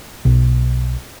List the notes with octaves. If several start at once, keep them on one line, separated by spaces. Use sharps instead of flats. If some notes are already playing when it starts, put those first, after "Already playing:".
B1